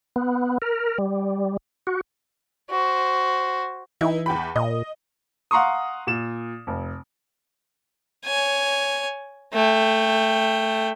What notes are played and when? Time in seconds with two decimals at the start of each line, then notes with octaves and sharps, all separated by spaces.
0.16 B3
0.62 A#4
0.98 G3
1.87 F#4
2.70 F#4 C5
4.01 E3 D#4 E4
4.26 E2 G5 B5
4.56 A#2 D#5
5.51 F5 F#5 A#5 C6 C#6 D#6
6.07 A#2 E7
6.67 F1
8.25 C#5 G#5
9.53 A3 G5